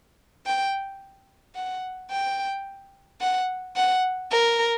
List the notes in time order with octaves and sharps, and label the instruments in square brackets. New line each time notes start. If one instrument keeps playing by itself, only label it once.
[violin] G5
F#5
G5
F#5
F#5
A#4